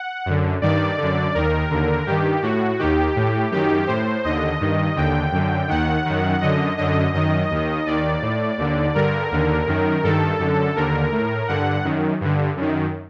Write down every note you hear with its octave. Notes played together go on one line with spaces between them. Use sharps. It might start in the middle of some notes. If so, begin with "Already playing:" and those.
Already playing: F#5
F#2 D3
G2 D#3 D5
D3
F#2
D#2 D#3 A#4
D#2 D3
G2 D#3 G4
A2 F#4
D#2 D#3 G4
A2
F#2 D#3 G4
A2 C5
D#2 D3 D#5
G2 D#3
D#2 D3 G5
F#2 D3
D#2 D#3 F#5
F#2 D#3
F#2 D3 D#5
F#2 D3 D#5
F#2 D#3 D#5
D#2 D#3
D#2 D#3 D5
A2
D#2 D3
G2 D3 A#4
D#2 D3
F#2 D#3
G2 D#3 A4
F#2 D3
D#2 D3 A#4
A2
G2 D3 F#5
F#2 D#3
G2 D3
F#2 D#3